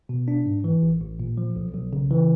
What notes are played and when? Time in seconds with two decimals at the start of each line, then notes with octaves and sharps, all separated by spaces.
0.09 B2
0.28 D4
0.46 G#2
0.64 E3
0.83 A1
1.01 A1
1.20 A#2
1.38 F3
1.56 B1
1.74 B1
1.93 C#3
2.11 E3